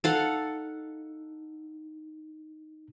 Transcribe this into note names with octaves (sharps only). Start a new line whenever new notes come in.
D#4 A4 F5 F#5